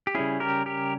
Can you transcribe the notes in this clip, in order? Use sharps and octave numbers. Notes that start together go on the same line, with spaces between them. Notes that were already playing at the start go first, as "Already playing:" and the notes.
G4
C#3 G3 C#4 E4 G#4
G4 A#4
G4 A#4